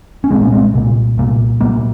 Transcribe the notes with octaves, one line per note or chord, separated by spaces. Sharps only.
C#4
C2 A#2 G#3 C4
A#3 C#4
G#3 C4
C2 A#2
C2 A#2
C2 A#2 F#3 A#3